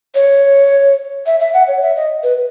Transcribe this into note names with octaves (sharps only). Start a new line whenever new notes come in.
C#5
E5
E5
F#5
C#5
E5
D#5
B4